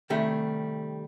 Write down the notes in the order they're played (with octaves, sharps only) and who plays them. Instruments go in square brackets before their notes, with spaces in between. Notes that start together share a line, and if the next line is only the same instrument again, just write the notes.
[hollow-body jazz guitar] C3 D#3 G3 A3